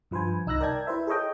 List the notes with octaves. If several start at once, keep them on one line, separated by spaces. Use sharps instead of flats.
G2 F3 B4 C5 G#5
C2 D#4 E6 F#6 A#6
A#4 D5 G5 A5 G#6
E4 B4 C5 E5
G#4 A4 C#5 D#5 G5